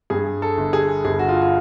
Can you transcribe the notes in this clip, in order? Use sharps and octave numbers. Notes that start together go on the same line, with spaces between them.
G2 G#4
A4
G1
G#4
G1 G#4
F#4
F4
F4